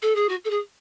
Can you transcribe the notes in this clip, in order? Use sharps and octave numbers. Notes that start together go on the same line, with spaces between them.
A4
G#4
F#4
A4
G#4